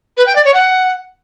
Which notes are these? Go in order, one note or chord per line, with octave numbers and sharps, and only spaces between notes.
B4
G5
D5
C#5
F#5